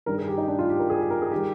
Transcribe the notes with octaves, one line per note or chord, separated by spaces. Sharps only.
G2 D#3 G3 A#4
G#4
G4
D#4
D4
F4
G4
A#4
G#4
G4
A#4
G#4
D#3 G3 G4